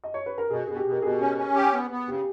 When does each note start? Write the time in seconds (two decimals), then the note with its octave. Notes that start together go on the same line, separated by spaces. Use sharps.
0.04 D#5
0.14 C#5
0.26 B4
0.38 A#4
0.50 B2 G#4
0.67 B2 G#4
0.76 G4
0.85 B2
0.91 A#4
1.02 B2 G#4
1.21 C#4
1.38 C#4
1.55 G4
1.73 B3
1.91 B3
2.08 C#3 G4